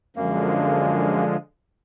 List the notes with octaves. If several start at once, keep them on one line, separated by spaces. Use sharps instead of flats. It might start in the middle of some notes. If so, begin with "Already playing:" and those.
F#2 D3 F3 G#3 A#3